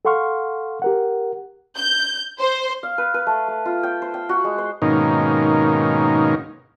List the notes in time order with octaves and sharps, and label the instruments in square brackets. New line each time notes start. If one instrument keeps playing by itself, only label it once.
[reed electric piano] A4 F5 F#5 C6 C#6 F6
G4 A#4 F#5
[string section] G6
C5
[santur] F5
B4
B4
A3
A3
F4
G5
C5
G5
F#4
G#3
C5
[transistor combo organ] G#2 B2 D#3 A#3 C#4 D#4